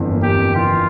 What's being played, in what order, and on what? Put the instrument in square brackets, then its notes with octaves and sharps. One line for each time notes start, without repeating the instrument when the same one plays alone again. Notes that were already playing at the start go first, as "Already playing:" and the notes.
Already playing: [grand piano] G1 F2 E3
A#3
[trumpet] G4
[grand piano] F2
[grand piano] E3 [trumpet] F4